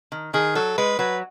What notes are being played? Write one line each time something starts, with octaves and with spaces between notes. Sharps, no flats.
D#3
D#3 G#4
F#3 A4
G#3 B4
F#3 B4